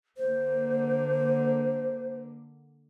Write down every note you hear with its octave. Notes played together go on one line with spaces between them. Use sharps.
D3 A#3 C5